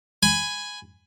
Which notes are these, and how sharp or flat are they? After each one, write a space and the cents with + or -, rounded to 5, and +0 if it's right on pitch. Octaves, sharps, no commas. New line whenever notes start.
G#5 +0 B5 +20